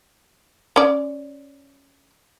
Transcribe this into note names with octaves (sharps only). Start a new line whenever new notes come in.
C#4 D5